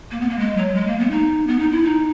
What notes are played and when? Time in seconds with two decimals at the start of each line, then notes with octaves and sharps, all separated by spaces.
0.11 A#3
0.20 B3
0.29 A#3
0.38 G#3
0.57 F#3
0.75 G#3
0.87 A#3
0.99 B3
1.11 D#4
1.47 B3
1.59 D#4
1.71 E4
1.84 D#4